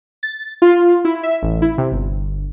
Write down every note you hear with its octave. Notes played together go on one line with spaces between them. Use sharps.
A6
F4
E4
E5
A1
E4
C3
G1